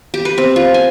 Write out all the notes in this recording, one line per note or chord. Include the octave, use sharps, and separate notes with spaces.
G4
B4
C4
F4
G#5